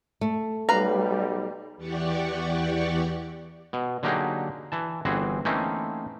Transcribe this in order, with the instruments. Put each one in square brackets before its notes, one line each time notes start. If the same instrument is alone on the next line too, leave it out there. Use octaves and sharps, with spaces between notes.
[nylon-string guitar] A3
[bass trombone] B1 [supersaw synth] G3 [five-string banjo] B4 F5 A#5
[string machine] E2 E3 G4 D5 F#5 C#6
[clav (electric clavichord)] B2
D3 F#3 A#3 D#4 G4 G#4
E3 A5
G1 E3 C4 F#4 G#4
E3 A3 A#3 C4 C#4 D#4